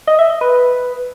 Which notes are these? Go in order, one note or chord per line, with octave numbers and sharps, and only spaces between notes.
D#5
E5
D#5
B4